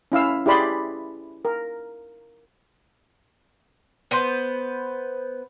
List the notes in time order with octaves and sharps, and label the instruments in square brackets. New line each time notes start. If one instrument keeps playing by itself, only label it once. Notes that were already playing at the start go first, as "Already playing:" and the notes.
[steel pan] C#4 E4 F5 E6
E4 G4 G#4 D5 B5 C6
A#4
[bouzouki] B3 B4 C5